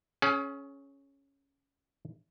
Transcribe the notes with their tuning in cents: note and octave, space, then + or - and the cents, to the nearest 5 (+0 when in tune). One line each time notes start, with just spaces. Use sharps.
C#4 +0 G#4 +35 F#5 +45